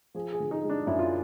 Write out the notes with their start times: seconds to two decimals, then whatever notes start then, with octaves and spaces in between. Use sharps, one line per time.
0.15 F3 G#4
0.33 G#4
0.40 D3
0.51 D#4
0.63 G#3
0.70 D4
0.87 F#2 E4
0.99 F4